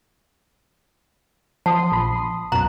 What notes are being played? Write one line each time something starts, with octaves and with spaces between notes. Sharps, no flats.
F3 A5 C6 D#6 C7
A#1 B5
C#2 F#2 B2 A#5 F#6